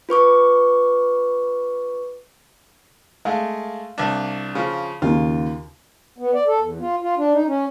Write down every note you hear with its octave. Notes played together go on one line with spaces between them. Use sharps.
F4 B4 C#6 D6
G#3 A3 F5
C2 D4
C#3 F3
D#2 C#3 F4
B3
D5
A4
E2
F4
F4
D4
D#4
C#4